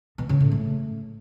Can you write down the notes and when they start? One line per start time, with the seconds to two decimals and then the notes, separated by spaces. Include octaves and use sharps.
0.18 B2
0.29 C#3
0.40 A2
0.52 A3